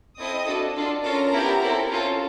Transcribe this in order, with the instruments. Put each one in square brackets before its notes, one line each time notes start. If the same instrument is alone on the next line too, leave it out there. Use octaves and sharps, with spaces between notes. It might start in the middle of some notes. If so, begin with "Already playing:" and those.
[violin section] C4 E4 A4 D#5 D#6
D4 F#4 A4
D4 F4 A4
C#4 F4 A4 A#4 A#5
B3 E4 G4
C4 E4 A4
C#4 F4 A4